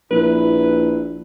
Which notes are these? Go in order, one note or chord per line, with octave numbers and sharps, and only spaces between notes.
A#1 E4 B4